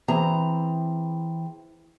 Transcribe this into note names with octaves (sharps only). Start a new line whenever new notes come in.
E3 C4 G#4 A#5